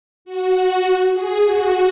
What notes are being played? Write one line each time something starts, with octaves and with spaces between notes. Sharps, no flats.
F#4
G#4
F#4